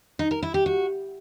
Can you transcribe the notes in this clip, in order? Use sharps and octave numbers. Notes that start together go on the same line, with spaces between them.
D#4
A#4
E4
G4
F#4